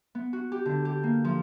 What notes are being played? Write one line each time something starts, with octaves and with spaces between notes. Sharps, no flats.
B3
F#4
G4
D3
G4
A#3
F3